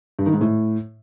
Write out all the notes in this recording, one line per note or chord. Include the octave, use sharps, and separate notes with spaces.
G2
D#3
G#2
A2